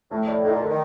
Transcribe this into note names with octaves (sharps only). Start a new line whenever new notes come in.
A2 A3
D5
A2 D#4
A#2
D3 A#4
D#3